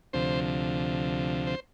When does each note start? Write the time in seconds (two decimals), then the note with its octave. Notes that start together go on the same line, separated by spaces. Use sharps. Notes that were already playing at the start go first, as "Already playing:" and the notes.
0.13 D2 C3 F3 C5
1.47 C5